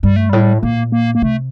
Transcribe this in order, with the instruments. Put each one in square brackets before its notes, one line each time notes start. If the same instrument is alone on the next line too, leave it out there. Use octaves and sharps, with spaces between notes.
[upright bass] G2 [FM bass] G3
[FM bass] A3
[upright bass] A2 [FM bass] G3
[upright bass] A#2 [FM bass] A#3
[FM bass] A#3
A#3
[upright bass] C3 [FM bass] A3